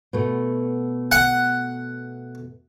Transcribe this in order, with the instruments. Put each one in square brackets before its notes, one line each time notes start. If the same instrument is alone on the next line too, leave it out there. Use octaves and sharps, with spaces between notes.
[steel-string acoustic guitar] B2 A3
[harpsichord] F#5